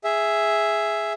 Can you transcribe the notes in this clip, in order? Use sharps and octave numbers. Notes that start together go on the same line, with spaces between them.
G#4 E5